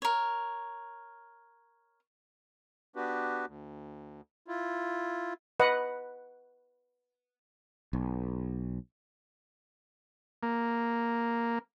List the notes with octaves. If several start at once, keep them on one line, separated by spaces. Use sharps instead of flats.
A#4 C#5
B3 D4 F#4 G4 B4
D2
E4 F4
B4 D#5 F#5
B1
A#3